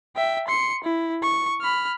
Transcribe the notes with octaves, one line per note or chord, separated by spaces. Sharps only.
E5 G5
C6 C#7
E4
C#6
B5 F6